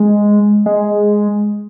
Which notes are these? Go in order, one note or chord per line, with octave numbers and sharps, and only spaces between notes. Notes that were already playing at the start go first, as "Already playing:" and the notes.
Already playing: G#3
G#3